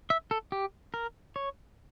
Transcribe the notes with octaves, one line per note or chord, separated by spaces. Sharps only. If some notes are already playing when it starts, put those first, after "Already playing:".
E5
A4
G4
A#4
C#5